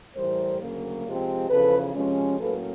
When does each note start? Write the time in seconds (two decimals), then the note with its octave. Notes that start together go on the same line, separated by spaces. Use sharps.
0.16 A2 E3 G3 A#4 C5
0.61 D2 C#3 F#3 A#3
1.06 C3 F3 G#3 C4
1.49 E2 C#3 F3 A4 B4
1.94 C3 F3 G#3 C#4
2.39 A2 F#3 A#3 C#4 A4 B4